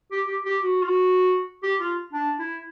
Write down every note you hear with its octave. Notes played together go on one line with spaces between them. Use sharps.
G4
G4
G4
F#4
F4
F#4
G4
F4
D4
E4